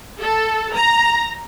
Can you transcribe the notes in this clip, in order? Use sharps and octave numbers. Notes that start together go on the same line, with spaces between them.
A4
A#5